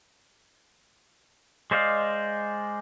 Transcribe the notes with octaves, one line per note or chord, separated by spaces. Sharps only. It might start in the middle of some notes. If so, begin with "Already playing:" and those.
G#3 C5 D5 D#5 F5